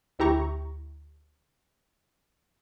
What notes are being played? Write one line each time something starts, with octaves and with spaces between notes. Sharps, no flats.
D2 E4 G4 A#5 C#6